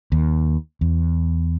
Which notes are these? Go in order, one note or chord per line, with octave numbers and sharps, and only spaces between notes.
D#2
E2